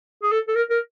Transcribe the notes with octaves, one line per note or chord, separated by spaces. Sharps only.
G#4
A4
A4
A#4
A#4